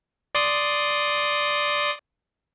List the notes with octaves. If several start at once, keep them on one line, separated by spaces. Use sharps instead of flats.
D5 C6 D#6